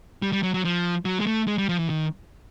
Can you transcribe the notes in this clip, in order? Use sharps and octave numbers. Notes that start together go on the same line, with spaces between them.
G3
G3
F#3
F#3
F3
F#3
G#3
A3
G#3
G3
F3
E3
D#3